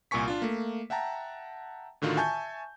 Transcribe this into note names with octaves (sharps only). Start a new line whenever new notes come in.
C2 A#2 A#4 G#5 C#6 B6
D4 F4
A3 A#3
E5 F#5 G5 A5 A#5
A2 D3 D#3 F4 F#4
E5 G#5 A5 C#6 G6